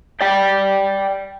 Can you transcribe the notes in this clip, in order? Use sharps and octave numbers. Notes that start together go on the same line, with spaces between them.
D5 G5